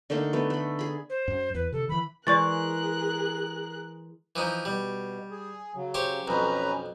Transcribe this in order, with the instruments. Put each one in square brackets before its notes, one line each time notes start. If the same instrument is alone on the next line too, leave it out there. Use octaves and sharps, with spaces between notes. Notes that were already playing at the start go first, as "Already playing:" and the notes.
[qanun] D3 A3 A#3 D#4
A3 B3
A3 B5
G#4 B5
[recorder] C5
[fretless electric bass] F#2
[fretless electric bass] E2 [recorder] B4
[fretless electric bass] C3 D#3 [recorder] A4
[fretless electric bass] D#3 E3 [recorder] B5
[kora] E3 G#3 [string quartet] G#4 A#4 F#6 [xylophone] D5 C#6 A6
[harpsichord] E3 F3 D#4
[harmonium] B2 [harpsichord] G3
[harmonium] G#4
C#3 F#3
[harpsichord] G4 C5 C#5
[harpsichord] B1 F2 [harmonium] C#4 B4 A#5